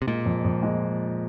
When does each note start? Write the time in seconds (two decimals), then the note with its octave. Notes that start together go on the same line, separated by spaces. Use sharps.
0.02 C3
0.07 A#2 G#3
0.26 F2
0.44 F2
0.63 G#3